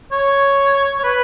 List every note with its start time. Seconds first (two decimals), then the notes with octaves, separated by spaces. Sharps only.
0.12 C#5
0.99 C#5
1.04 B4